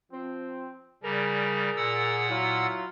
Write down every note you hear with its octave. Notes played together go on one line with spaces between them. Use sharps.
F3 C4
C#3 G3 G#4 A#4 D5
A#2 F#5 E6
F#3 E4 F4